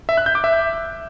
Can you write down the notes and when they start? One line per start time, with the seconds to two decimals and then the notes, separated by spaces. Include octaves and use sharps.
0.09 E5
0.17 F#6
0.26 G6
0.35 D6
0.44 E5